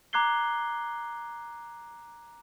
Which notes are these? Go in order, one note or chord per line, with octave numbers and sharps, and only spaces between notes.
A#5 D6 F#6 G#6 C7 G7